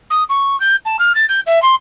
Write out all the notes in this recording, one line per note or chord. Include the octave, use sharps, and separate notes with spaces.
D#6
C#6
G6
A5
F6
A6
G6
E5
C6